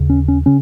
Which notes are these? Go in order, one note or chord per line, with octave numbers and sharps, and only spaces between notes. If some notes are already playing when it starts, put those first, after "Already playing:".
Already playing: D#2 C#3
C#4
C#4
C#3 C#4